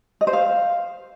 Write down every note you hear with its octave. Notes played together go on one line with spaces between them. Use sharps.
D#5
C5
F5